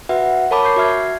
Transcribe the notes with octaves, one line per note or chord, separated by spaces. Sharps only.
F#4 B4 E5 F#5
A#4 C#5 A5 B5 D6
C#6 G6 C7
F#4 E5 F6 G#6